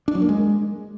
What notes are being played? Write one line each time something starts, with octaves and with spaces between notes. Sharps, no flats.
D4
F#3
A#3
G#3